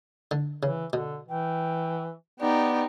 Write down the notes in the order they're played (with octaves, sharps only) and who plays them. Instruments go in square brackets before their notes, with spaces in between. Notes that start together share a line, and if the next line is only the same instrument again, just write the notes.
[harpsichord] D3
[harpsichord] C#3 [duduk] E3
[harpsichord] B2 [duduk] D3
[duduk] E3 [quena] G5
[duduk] B3 [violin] D#4 G4 [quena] D5